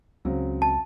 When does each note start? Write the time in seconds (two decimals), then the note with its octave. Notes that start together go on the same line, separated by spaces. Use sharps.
0.25 C#2 C#3 F#3 C4
0.62 A5